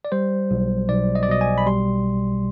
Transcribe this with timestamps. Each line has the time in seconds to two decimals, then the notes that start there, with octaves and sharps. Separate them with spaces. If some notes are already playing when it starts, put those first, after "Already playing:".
0.05 D5
0.12 G3 C5
0.51 B1
0.89 B1 D5
1.15 D#5
1.23 D5
1.28 B2 D#5
1.41 G#5
1.58 B5
1.66 G3 C6